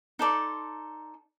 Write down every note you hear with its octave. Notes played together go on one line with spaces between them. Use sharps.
D#4 A4 D5 C6